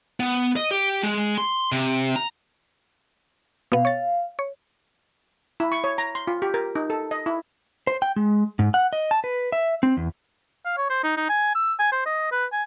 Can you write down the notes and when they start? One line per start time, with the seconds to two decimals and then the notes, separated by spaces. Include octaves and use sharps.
0.20 B3
0.56 D#5
0.71 G4
1.03 G#3
1.38 C6
1.72 C3
2.16 A#5
3.72 B2 B3 F5
3.85 C#5 A6
4.39 C#5
5.60 E4
5.72 C#6
5.84 C#5
5.98 A#5
6.15 C6
6.27 F4
6.42 G4
6.54 A#4
6.75 D#4
6.90 A4
7.11 D#5
7.26 E4
7.87 C5
8.02 G5
8.16 G#3
8.59 G#2
8.74 F#5
8.93 D#5
9.11 A5
9.24 B4
9.52 E5
9.83 C4
9.97 E2
10.65 F5
10.77 C#5
10.90 C5
11.04 D#4
11.17 D#4
11.29 G#5
11.55 E6
11.79 G#5
11.92 C5
12.06 D#5
12.32 B4
12.52 G#5